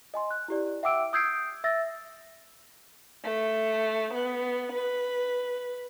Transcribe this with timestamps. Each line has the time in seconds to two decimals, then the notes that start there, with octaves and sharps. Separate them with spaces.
0.14 D#5 G#5 C6
0.31 F#6
0.48 E4 G4 D5
0.83 E5 F#5 G5 D6 E6 D7
1.13 D#6 E6 G6 G#6 C7 D7
1.64 E5 E6 A6 A#6
3.23 A3
4.13 B3
4.72 B4